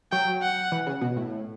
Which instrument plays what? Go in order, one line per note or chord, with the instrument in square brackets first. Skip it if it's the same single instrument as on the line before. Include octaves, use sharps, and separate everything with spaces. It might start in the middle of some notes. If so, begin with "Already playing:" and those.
[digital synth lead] F#3 [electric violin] G5
[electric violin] F#5
[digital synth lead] E3
C#3
B2
A2